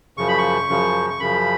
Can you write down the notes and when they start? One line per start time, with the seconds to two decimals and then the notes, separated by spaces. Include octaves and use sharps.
0.17 F#2 C#3 F3 C#6
0.28 B5
0.38 C#6
0.69 F#2 C#3 F3
1.10 C#6
1.20 F#2 C#3 F3 B5